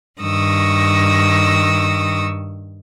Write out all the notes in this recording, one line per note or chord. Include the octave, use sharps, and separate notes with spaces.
G2 D#3 C#6 D#6 E6 A#6